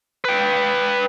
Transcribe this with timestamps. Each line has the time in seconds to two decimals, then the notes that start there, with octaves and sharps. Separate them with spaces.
0.25 B4 G5